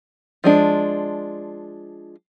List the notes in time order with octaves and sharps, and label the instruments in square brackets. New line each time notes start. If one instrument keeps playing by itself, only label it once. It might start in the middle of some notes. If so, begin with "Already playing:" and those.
[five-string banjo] F3 G#3 D4